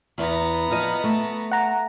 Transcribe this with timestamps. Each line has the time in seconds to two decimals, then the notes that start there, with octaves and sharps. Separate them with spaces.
0.18 E2 B3 A#5
0.70 F3 D#5
1.04 A3
1.52 F#5 A#5